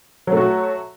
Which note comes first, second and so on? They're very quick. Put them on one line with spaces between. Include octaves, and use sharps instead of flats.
F#3 A3 F#4